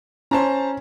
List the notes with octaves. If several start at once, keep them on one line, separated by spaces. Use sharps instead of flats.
C#4 C5 A5 A#5